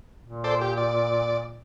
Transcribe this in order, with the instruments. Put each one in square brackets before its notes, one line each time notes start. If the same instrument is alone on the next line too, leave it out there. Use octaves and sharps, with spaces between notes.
[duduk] A#2
[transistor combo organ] A4 C5 D5
G4
D5